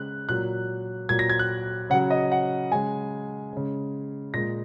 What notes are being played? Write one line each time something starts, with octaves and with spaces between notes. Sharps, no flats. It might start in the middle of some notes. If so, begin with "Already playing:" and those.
Already playing: C#3 G#3 F#6
A#2 F#3 F#6
A#2 F#3 G#6
A#6
G#6
F#6
C#3 F#3 F#5
D#5
F#5
C#3 G#3 G#5
C#3 G#3
A#2 G#3 A#6